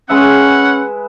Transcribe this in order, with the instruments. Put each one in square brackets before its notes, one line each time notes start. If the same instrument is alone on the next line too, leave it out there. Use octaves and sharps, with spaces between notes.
[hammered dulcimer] G#3 B4 E5 [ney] C#4 [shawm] F#5